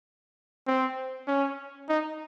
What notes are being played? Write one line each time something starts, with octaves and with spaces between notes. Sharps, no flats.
C4
C#4
D#4